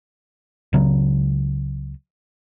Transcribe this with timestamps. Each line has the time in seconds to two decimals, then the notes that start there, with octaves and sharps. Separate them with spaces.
0.73 C#2 C#3 F#3